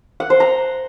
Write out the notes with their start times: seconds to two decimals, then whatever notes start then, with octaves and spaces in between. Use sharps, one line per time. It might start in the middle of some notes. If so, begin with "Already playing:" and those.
0.20 F#5
0.30 C5
0.40 A#5